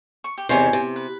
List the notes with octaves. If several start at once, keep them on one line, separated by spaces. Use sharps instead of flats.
C#6
G4
E2 C3 D#3 C5 C#5 G#5
C3
B4